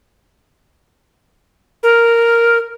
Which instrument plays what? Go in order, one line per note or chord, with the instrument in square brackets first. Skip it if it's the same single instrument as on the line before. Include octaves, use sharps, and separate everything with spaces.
[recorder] A#4